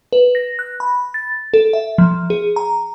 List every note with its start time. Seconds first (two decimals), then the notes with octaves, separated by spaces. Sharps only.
0.13 B4
0.35 A#6
0.59 F#6
0.80 B5
1.14 A6
1.54 A4
1.73 E5
1.98 F3
2.30 G#4
2.56 A#5